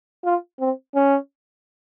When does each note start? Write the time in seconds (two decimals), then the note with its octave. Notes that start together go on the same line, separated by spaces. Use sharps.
0.25 F4
0.60 C4
0.95 C#4